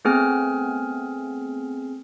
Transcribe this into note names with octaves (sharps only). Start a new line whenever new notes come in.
A3 B3 C4 G#4 G#5 F6